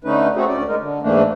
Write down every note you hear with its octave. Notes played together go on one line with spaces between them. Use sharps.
D3 A3 C#4 D#4 B4
A3 C4 C#4 F#4 G#4 A4
D2 C#4 D5
G#3 D#4 A#4
D3
G#2 E3 A3 A#3 D4